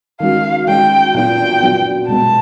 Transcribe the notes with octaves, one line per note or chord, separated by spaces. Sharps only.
D#3 G#3 C#4 F#4 F5
D#3 G#3 C#4 F#4 G5
A#2 F#3 B3 D4 F4 G5
A#2 F#3 B3 D4 F4
B2 G#3 B3 A5